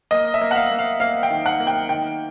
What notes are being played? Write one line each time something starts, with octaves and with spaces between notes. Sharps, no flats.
A#3 D#5
E5
A#3
F#5
F5
A#3
F5
A#3 F5
G5
D#3
F#5
A#3
G5
D#3 G5